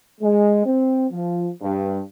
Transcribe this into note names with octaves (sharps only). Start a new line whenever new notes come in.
G#3
C4
F3
G2